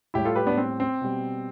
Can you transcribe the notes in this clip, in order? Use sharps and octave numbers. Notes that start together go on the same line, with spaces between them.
A2 G3 E4 G4
F4 A4
G4 B4
B3 D4
C4
C4
B2 G3